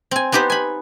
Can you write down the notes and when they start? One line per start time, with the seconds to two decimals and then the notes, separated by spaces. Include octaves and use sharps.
0.11 C4 G#5
0.32 B3 D#4 G4 B4 C5
0.50 G#5 B5